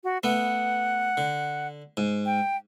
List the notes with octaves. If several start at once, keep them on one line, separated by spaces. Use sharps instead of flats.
F#4
A3 B3 F#5
D3
G#2
G5